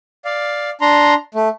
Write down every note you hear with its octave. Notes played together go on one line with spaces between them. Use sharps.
D5 F5
D4 A#5 C6
A3